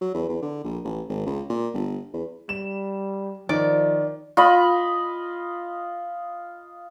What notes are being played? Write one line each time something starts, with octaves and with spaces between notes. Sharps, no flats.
F#3
E2
E2
D3
A#1
A1
G#1
C#2
A#2
G1
E2
G3 E7
D#3 F3 D5
F4 D#5 B5